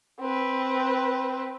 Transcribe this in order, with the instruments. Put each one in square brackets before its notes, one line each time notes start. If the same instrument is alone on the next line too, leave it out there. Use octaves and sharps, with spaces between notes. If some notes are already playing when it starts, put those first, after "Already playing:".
[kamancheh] C4 B4